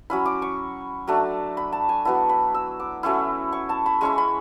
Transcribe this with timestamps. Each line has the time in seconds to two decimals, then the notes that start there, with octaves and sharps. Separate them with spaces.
0.10 F#3 C#4 E4 B5
0.26 D6
0.42 C#6
1.08 F#3 A3 D4
1.57 B5
1.72 A5
1.89 G#5
2.05 F#3 B3 E4 A5
2.29 B5
2.55 E6
2.80 D6
3.03 F#3 A3 C#4 E4 C#6
3.52 C#6
3.69 A5
3.86 B5
4.01 G#3 C#4 E4 C#6
4.18 B5